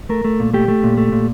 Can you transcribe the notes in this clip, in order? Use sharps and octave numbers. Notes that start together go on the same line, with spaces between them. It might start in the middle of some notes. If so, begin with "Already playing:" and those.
A3 A#4
A3
A#2
A3 G4
A3
A#2
A3
A#2